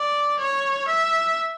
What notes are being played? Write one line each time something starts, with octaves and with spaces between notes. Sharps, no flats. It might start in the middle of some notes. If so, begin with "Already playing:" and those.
Already playing: D5
C#5
E5